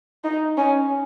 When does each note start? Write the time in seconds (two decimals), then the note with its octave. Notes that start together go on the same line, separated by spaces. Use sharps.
0.24 D#4
0.57 C#4